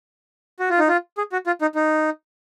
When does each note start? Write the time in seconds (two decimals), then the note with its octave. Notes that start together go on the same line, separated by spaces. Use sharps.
0.59 F#4
0.70 F4
0.79 D#4
0.88 F4
1.18 G#4
1.32 F#4
1.47 F4
1.61 D#4
1.75 D#4